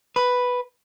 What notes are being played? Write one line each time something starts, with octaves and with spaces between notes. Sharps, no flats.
B4